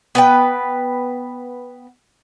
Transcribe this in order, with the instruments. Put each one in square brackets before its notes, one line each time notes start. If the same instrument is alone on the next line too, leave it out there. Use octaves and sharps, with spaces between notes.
[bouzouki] B3 B4 G5